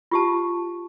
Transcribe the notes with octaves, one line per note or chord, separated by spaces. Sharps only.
F4 G4 A5